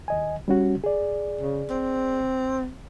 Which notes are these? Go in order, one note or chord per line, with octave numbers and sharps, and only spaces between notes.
D#2 D#5 G#5
G3 C#4 F#4
G#4 D5
C#3
C4